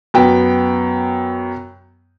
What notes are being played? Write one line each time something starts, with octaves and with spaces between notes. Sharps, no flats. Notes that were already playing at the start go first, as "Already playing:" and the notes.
F#2 B3 G5